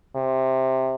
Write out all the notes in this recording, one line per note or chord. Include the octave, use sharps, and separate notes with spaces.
C3